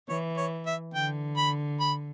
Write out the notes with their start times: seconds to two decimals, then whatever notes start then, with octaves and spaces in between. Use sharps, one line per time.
0.09 E3 C#5
0.37 C#5
0.66 E5
0.94 D3 G5
1.37 B5
1.80 B5